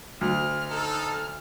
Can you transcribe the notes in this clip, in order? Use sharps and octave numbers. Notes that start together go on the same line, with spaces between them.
D2 F6
D#4 A4